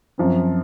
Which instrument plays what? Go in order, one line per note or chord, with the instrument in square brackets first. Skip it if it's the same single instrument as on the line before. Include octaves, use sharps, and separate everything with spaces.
[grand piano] F#2 F3 C4